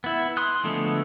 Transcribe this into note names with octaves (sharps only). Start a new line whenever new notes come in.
B3 E4
C6 D#6 F#6
D3 F3 G#3 A3 B3